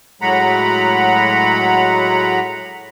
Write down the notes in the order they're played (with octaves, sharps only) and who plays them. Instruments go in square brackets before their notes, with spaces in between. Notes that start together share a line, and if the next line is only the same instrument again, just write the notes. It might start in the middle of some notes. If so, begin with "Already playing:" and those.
[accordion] A2 F#3 G#3 F#5 A#5 B5